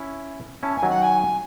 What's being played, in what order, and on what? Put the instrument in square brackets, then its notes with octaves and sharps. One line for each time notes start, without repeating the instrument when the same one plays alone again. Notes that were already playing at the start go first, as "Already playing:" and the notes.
Already playing: [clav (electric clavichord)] C#4 E4
[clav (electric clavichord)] C#4 E4 [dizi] A5
[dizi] G#5
[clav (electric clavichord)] D#3 F#3
[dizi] F#5
G#5